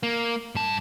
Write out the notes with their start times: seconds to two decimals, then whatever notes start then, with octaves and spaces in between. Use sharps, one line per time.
0.03 A#3
0.55 G2 A5